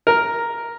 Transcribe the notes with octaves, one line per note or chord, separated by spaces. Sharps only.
A#4